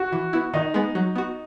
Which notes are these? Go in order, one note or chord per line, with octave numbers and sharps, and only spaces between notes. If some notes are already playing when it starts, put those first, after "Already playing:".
Already playing: F#4
E3
B3 E4
D#3 D#4
G#3 B3
F#3
B3 F#4